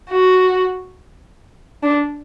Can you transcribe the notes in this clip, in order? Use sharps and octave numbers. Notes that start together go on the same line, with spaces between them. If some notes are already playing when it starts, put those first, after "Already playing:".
F#4
D4